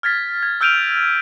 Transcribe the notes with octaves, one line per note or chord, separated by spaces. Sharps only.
F6 G#6 A6 B6
G#6
E6 F6 G6 D7 D#7 F7